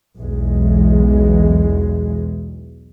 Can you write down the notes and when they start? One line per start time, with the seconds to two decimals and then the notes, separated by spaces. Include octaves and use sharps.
0.18 B1 E2 G#3